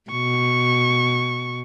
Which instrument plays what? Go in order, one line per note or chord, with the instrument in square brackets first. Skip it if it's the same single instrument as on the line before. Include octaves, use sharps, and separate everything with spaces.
[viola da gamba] B2 [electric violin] C#6